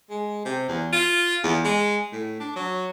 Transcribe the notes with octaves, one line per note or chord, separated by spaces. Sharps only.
G#3
C3
E2
F4
E2
G#3
A2
D4
F#3